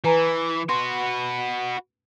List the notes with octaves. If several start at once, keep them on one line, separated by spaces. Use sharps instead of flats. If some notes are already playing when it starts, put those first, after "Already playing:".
E3 B4 G#5 A#5
F#4 B4 C6